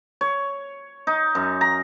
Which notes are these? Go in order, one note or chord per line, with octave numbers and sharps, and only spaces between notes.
C#5
D#4
F#2
A#5